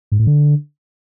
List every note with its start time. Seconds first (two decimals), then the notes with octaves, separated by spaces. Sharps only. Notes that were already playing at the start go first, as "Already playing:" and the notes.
0.12 G#2
0.19 A2
0.27 D3